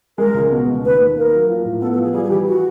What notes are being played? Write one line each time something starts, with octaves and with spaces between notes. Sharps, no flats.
G#3 A#4
C#2
B2
C#2
D#2 B4
D#2
A#3 A#4
F#3
F3
A2
B3 A4
A4
F3
G#4
G3 G#4
G#4
E3 G4
F#4